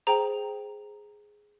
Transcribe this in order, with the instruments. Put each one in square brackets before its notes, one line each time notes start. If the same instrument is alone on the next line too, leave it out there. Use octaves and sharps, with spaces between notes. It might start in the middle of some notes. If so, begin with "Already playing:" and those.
[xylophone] G#4 C5 G5 A#5